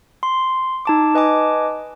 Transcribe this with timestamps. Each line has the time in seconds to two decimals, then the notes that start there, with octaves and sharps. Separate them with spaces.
0.23 C6
0.85 D#4 A5 D6
1.15 B4 D#5 G#5 A5 D6